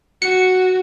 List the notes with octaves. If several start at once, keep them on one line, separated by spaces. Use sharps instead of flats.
F#4 C#7